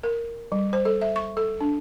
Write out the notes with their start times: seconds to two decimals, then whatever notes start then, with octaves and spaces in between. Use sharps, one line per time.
0.03 A#4
0.52 G3
0.73 C5
0.85 A4
1.01 E5
1.16 C#6
1.37 A4
1.61 D4